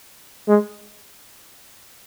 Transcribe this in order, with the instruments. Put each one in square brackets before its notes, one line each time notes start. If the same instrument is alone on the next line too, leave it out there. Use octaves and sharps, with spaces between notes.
[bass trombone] G#3